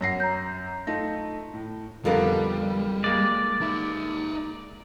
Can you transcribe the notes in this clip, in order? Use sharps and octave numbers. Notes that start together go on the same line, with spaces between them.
F#2 C#5 F#5 A#6 C7
A#5 G6
A3 D#4 F4 A#6
A2
F2 D3 G3 B3 F4 A4 A#4
G#3 A#3 D5
D#4 E5